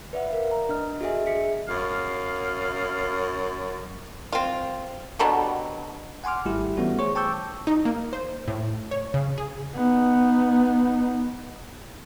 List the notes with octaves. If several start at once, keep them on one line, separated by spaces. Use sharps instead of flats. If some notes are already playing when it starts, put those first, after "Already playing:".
B4 D5 E5 F#5
A#4 F5
A#5
D4 D#5 F6
F#4 G#4 A4 D#5 E5 G#5
G#4 E5 B6 C#7
F#2 F5
C4 F4
B2 D3 F#3 G3
F#5 G#5 C6 D6 F6
G#1 G3 A3 E4 G4
E3 G3 A3 B3 C#4 F#4
G#4 C5 C#5 C#6
G5 A5 C#6 D6 E6 G6
D#4
A#3
C5
A2
C#5
C#3
G#4
B3 D#4